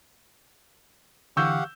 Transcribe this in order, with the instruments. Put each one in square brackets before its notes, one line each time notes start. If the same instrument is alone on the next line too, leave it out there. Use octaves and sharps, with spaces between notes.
[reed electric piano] D3 E3 [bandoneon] G4 F5 F#5 [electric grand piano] C#6 E6 G6